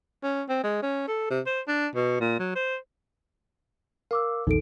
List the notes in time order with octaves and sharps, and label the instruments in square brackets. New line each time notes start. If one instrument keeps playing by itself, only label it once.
[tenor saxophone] C#4
C4
G#3
C#4
A4
C3
C5
D4
B2
A#2
F#3
C5
[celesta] A#4 D6 E6 [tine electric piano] F5
[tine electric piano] A#1 E2 D#3 [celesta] D#4 A4 D7